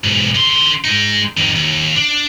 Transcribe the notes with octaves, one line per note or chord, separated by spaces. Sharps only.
B1 G#2
D3 C6
G#3 D#4
F2 D#3
D#2
D4